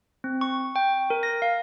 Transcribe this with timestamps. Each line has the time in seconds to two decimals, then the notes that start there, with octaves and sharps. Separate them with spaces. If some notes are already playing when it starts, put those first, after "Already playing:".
0.24 C4
0.41 C#6
0.76 G5
1.10 A#4
1.23 A#6
1.42 F5